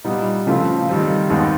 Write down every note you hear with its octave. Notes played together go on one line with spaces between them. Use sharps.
A#2 G3 B3 D#4
C#3 F3 A3 C4 F4
D#3 G3 C4
D#2 D#3 G#3 B3 D#4